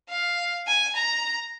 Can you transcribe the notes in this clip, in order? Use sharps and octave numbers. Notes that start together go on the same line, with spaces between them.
F5
G#5
A#5